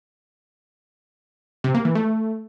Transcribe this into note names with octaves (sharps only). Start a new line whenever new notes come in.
C3
A#3
E3
A3